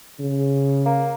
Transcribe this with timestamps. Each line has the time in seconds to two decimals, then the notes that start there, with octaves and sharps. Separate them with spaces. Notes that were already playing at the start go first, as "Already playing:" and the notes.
0.20 C#3
0.85 A#3